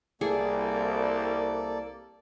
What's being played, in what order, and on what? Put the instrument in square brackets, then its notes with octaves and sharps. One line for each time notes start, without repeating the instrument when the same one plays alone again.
[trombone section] C2 [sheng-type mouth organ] A#3 A4 D5 [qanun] G#4